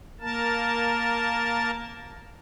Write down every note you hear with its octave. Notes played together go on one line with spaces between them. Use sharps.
A#3 A#4 A5